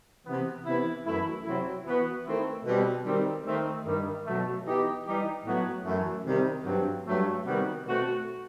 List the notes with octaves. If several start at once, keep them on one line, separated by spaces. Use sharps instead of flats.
C3 E3 B3
C3 E3 B3 E4
F#2 E3 A3 E4
C3 F#3 C4 E4
E3 B3 F#4
D#3 A3 C4 E4
B2 G3 C4
D#3 G3 C4
D#3 A3 C4
G2 D#3 G3
B2 F#3 A3
E3 B3 D#4 G4
E3 G3 D#4 G4
A2 F#3 B3 F#4
F#2 E3 A3
C3 D#3 G3
G2 F#3 C4
G2 F#3 A3
C3 D#3 G3 B3 F#4
B2 A3 C4 F#4